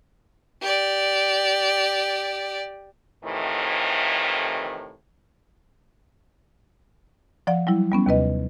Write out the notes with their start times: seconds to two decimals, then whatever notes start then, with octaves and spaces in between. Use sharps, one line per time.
0.62 G4 D5
3.23 F2 A2 C3 D#3 E3
7.47 F3 D5 F#5
7.67 F#3 G3 E4
7.92 G3 B3 C#4
8.06 D#2 C3 B4 D#5